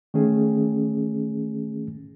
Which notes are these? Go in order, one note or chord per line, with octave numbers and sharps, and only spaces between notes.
D#3 A3 C#4 G#4